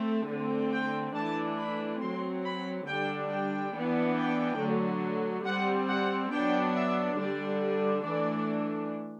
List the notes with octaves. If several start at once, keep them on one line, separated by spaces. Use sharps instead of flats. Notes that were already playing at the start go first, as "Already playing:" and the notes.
Already playing: A3 C4
D3 A3 C4
G5
E3 A3 D4 A5
B5
F#3 C4 C6
B5
D3 G3 D4 G5
G5
E3 B3 D4
G5
D3 F#3 A3
G3 C4 F#5
F#5
F#3 B3 D4 G5
E5
D3 G3 D4 D5
E3 A3 D4 D5